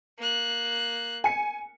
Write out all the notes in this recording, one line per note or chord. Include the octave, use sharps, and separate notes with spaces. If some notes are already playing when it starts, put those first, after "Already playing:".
A#3 F#6
G#5 C#7